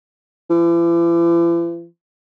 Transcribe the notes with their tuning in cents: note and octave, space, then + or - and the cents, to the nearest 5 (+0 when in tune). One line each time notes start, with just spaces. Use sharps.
E3 +45